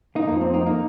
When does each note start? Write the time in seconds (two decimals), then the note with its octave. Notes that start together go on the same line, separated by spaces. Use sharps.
0.15 A#3 D#4
0.28 F2 F3 A#3
0.41 C4
0.54 A#3 D#4
0.66 A#3 D#4